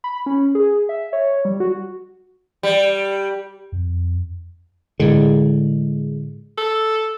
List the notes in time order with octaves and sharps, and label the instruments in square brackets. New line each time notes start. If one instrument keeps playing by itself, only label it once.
[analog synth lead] B5
C#4
G#4
E5
C#5
G3
F#4
[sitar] G3
[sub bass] F2
[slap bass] A2 D3 [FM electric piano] G#3
[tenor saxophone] A4